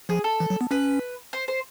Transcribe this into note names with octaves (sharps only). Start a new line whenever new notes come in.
F3 G#4
A4
E3
F#3
B3
C#4 B4
C5
C5